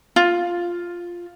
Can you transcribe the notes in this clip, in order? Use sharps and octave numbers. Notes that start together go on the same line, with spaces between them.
F4